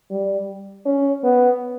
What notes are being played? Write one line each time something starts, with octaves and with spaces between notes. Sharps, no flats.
G3
C#4
B3